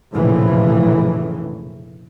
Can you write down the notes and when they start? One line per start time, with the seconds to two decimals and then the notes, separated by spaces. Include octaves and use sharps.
0.12 F1 A#1 A2 C#3 E3